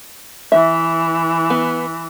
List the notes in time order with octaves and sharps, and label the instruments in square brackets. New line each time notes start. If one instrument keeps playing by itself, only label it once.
[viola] E3 [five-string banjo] E5
[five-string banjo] B3